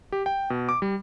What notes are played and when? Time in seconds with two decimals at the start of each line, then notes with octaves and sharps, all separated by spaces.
0.12 G4
0.26 G5
0.50 B2
0.69 D6
0.82 G3